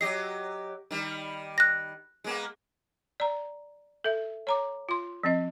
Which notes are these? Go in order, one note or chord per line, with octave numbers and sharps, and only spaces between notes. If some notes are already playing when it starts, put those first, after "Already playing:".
F#3 G4 D#5 C7
D#3 G3
F#6 A#6
G#3 A#3 B3
D5 A#5
A4 E5
C#5 A#5 D6
F4 C6
F3 C4 D#5